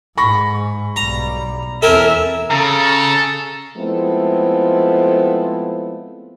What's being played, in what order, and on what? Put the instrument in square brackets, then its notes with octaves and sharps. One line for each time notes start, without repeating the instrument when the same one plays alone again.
[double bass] G#2 [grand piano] B5 C#6 A#6
[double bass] B1 G3 [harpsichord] A#5
[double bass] E2 C4 [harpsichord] A4 A#4 G#5 [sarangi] E5
[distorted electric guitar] C#3 [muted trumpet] A4 [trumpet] A#5
[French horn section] F3 G#3 A3 B3 C4 E4